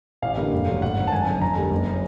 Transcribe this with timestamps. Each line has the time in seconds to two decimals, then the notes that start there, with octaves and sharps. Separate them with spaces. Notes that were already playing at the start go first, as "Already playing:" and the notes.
0.22 A1 F5
0.37 G2 D3 G3 A#3
0.52 F1
0.67 F2 D3 F#3
0.82 G#1 F#5
0.96 F#2 D#3
1.07 A5
1.12 F#1 G#5
1.26 F#2 D3 A5
1.41 F2 A#5
1.56 D3 G3 A#3
1.71 F#1
1.91 C#3